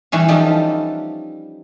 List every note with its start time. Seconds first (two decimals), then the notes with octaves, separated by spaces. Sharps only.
0.12 E3 G3 C#4
0.28 F3 G3 D#4 A4